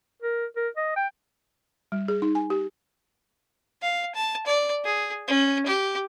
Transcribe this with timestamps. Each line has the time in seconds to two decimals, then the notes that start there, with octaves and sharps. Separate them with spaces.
0.22 A#4
0.56 A#4
0.77 D#5
0.96 G5
1.92 G3
2.08 G#4
2.22 D#4
2.35 G#5
2.50 G4
3.82 F5
4.15 A5
4.46 D5
4.85 G#4
5.28 C#4
5.66 G4